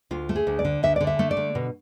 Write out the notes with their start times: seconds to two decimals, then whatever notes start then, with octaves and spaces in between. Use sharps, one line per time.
0.11 D2 F4
0.29 A3
0.36 G#4
0.47 D2
0.59 D5
0.65 D3
0.83 D2 E5
0.96 D3 D5
1.07 E5
1.19 A3
1.31 D5
1.37 D3
1.55 B2